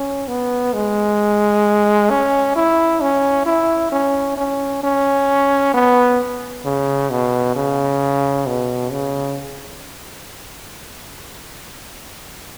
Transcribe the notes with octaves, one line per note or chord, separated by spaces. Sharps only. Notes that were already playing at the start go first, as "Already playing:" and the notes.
Already playing: C#4
B3
G#3
C#4
E4
C#4
E4
C#4
C#4
C#4
B3
C#3
B2
C#3
B2
C#3